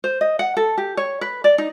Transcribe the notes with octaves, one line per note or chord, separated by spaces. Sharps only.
C5
D#5
F#5
A4
G4
C#5
B4
D5
D#4